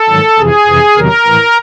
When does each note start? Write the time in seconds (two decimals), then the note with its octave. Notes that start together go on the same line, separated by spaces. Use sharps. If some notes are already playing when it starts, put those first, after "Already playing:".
Already playing: A4
0.09 G#2 D#3 F#3
0.38 F2 C3 E3 G#4
0.67 F2 C3 E3
0.97 E2 C3 D#3 F#3 A#4
1.26 A2 E3